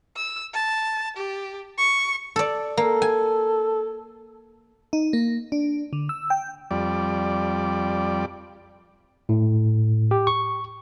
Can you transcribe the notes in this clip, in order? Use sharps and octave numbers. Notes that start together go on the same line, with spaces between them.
E6
A5
G4
C#6
A4 D5
A#3 A4
G#5
D#4
A#3
D4
D3
E6
G5
F2 G3 D5
A2
G4
C#6